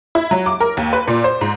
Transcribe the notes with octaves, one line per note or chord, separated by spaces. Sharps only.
E4
F#3
D6
A#4
D#2
B4
A#2
C5
G#2